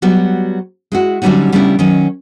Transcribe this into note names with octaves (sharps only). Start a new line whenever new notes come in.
F#3 G3 B3 F#4
G#3 E4 F#4
D3 F#3 G3 C#4 D#4 F#4
C#3 G3 A3 B3 D4 E4
D#3 F#3 C#4